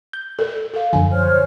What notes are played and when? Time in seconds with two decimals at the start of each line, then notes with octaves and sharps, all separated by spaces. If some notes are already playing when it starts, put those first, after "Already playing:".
0.13 G6
0.39 A4 A#4
0.74 A4 F5
0.93 F#2 D3 F3 G#5
1.13 C5 C#5 F6